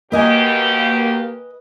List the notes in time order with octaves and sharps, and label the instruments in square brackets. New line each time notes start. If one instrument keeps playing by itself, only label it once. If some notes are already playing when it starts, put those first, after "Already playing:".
[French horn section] D#2 B2 G4 [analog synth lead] A#3 [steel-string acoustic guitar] B4 D#5 G#5